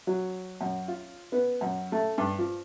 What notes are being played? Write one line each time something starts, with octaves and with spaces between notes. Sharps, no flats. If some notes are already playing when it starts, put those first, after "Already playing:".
F#3
F#2
F4
B3
F#2
A3
G2
F3